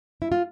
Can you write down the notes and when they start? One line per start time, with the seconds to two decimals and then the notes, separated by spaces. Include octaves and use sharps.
0.22 E4
0.32 F4